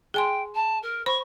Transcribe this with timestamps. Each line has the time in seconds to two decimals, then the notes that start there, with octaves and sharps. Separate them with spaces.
0.14 G#4 G5 G#5 C6
0.55 A5
0.82 A#4
1.06 C5 B5 C#6